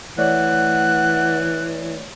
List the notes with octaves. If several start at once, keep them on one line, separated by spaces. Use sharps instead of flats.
E3 A3 C#5 D5 F#5 F#6